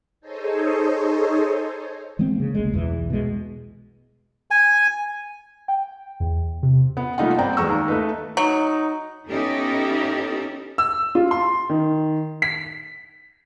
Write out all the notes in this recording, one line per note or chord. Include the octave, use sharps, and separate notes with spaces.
D#4 G#4 A4 C5 C#5 D#5
E3 G#3 B3 C4
C#3 A#3
C2 G#3
B1 E2 E3
B2 G#3
G#5
G5
E2
C3
B3
G3 A3 A#3 D#4 F4 F#5
B3 C4 C5 D5 G5 A#5
E2 G#3 A#5 C#6 E6
D#2
A3 D#4 B4
F#3 D#4
B3 C#4 D#4 E4 G4 A4
E6
F4
C6
D#3
B6